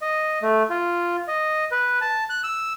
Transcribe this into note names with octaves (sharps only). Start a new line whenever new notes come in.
D#5
A3
F4
D#5
B4
A5
F#6
E6